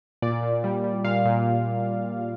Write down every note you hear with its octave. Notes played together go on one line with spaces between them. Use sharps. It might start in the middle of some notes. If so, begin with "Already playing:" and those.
A#2 D5
A#2
G3
G3
A#2 F5
A#2